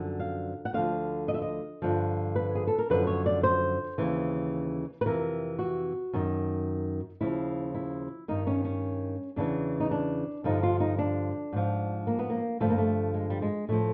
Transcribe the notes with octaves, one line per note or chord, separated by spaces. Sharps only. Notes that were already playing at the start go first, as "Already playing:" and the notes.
Already playing: F#2 D3 F3
F5
F#5
D2 D3 F3 F5
D#5
E5
D#5
G2 D3 F3
B4
G#4
A4
A#4
F#2 D3 F3 B4
C#5
D5
C5
D#2 C#3 E3
B4
F2 C3 E3 A#4
F#4
F#2 D#3
D#2 C#3 F3 E4
E4
G2 D#3 D#4
C#4
C#4
E2 C#3 E3 D4
D#4
D4
G2 D3 F3 D#4
F4
D#4
D4
G#2 F3
A#3
B3
A#3
G2 D3 F3 A3
A#3
A3
G#3
G3
G#3
A2 F3 A3